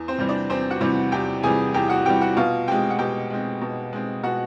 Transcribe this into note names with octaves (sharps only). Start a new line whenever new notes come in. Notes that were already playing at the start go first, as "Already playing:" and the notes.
Already playing: E2
C4 C5
C3 E3 G3
D4 D5
E2 C4 C5
F#4 F#5
C3 E3 G3
E2 G4 G5
C3 E3 G3 G#4 G#5
E2 G4 G5
F#4 F#5
C3 E3 G3 G4 G5
F#4 F#5
B2 F4 F5
G#3 C4 G4 G5
F#5
B2 G4 G5
G#3 C4
B2
G#3 C4
B2 F#4 F#5